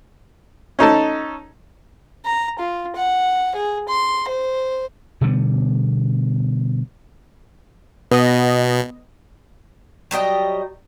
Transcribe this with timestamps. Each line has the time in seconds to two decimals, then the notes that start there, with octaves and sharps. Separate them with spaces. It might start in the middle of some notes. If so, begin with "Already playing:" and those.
0.79 C#4 D#4 A4 A5
2.25 A#5
2.59 F4
2.96 F#5
3.55 G#4
3.89 C6
4.28 C5
5.21 B2 D3 G3 B3
8.11 B2 B3 D#5
10.11 F#3 G3 D#5 G5